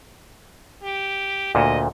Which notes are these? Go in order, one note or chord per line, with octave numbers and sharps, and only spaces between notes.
G4
D2 A#2 D#5